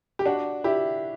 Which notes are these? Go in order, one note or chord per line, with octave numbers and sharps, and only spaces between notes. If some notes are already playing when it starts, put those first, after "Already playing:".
G4
D4 F#4
E4 G4